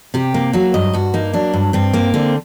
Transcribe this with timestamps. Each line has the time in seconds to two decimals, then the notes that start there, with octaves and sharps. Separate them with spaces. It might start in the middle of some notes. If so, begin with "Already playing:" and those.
0.14 C3 G4
0.34 A#3
0.53 F#3 F#4
0.74 G2 D#5
0.93 G2 F#4
1.14 A#3 D#4
1.33 F#3 D4
1.53 G2
1.73 G2 C4
1.94 A#3
2.14 D3 C4